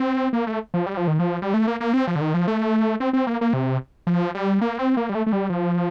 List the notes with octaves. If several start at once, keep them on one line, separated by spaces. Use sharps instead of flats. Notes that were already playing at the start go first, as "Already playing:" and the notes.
Already playing: C4
A#3
A3
F3
G3
F3
D#3
F3
G3
A3
A#3
A#3
C4
F3
D3
D#3
F3
A3
C4
C4
A#3
A#3
C3
F3
G3
A#3
C4
A#3
G3
A3
A3
G3
F3